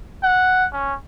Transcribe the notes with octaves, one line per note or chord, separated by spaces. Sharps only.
F#5
C#4